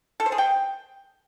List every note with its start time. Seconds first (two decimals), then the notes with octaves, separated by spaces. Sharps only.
0.20 A4
0.26 C5
0.32 G#4
0.38 G5